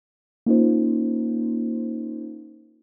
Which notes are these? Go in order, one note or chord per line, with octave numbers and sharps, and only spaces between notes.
A#3 C#4 D#4 F4 C5